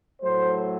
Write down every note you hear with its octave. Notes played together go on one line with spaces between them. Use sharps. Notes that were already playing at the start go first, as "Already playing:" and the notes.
A2 F#3 A3 C5